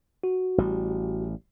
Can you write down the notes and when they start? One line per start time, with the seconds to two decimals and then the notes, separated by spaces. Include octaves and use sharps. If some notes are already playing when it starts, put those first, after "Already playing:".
0.24 F#4
0.58 A1 G3